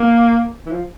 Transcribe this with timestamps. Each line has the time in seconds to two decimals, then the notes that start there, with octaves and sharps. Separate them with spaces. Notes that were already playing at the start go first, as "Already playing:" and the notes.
Already playing: A#3
0.66 E3
0.72 F3